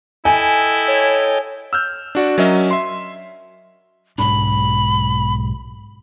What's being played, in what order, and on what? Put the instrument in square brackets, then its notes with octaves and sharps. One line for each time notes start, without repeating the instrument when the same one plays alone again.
[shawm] E4 [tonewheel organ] A4 D#5 G5 [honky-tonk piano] G#5
[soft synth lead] C#5
[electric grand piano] E6 F6 G6
D4 F#4 D5
F#3 C#4 A#4 D#5 E5
E5 C6
[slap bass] B1 G#2 D4 [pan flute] B5